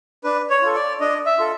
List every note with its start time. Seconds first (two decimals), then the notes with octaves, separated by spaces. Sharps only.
0.24 D4 B4
0.50 C#5
0.62 F4 A4
0.75 D5
1.00 D4 D#5
1.26 E5
1.39 F4 A4